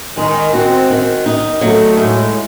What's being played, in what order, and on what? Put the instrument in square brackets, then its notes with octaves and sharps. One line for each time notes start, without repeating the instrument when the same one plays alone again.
[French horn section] D#3 [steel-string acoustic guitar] G#3
[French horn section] C4 [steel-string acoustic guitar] F#4
[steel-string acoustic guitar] D#3
D#4
[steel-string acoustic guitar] F#3 [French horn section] A3
[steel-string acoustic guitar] A2 [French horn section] G#3